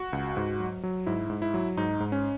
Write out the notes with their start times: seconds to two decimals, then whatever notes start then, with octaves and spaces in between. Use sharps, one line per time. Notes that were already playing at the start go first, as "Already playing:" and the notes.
Already playing: F#4
0.13 C#2
0.37 G#2
0.60 F#3
0.83 F#3
1.07 G#2 E4
1.30 G#2
1.42 E4
1.54 F#3
1.77 G#2 D#4
2.00 G#2
2.12 C#4